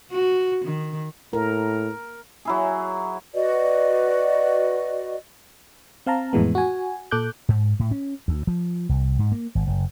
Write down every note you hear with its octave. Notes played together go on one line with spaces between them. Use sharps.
F#4
D#3
A2 A#4
F#3 E4 G#4
F#4 B4 D5 D#5
C4 F5 A5 A#5
F2 A2 E3 G#3 B3
F#4 G#5
A#2 A4 D6 F#6 G6
G#2
A2
C#4
D2
F3
C2
G#2
A#3
G#1
F#1